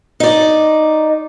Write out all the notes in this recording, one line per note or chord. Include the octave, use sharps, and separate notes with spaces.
D#4 D5